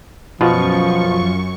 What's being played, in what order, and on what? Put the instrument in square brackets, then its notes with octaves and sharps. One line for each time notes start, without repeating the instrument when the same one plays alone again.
[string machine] F#2 C#6 [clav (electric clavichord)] B2 [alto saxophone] F3 [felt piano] F4